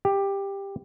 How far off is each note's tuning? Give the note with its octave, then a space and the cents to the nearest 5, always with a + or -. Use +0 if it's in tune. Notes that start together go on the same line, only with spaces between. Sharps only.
G4 +10